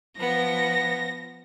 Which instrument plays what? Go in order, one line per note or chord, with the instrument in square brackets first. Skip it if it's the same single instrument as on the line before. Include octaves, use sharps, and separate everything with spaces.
[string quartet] F3 B3 [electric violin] A#6